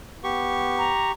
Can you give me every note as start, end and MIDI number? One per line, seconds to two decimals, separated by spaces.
0.24 0.94 59
0.24 1.12 67
0.24 1.12 85
0.78 1.10 82